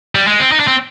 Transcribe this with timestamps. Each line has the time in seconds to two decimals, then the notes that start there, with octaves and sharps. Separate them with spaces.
0.15 G3
0.27 G#3
0.39 C4
0.52 D#4
0.60 D4
0.68 C4